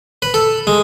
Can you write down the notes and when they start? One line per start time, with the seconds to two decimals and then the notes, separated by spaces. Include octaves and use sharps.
0.22 B4
0.34 A4
0.67 G#3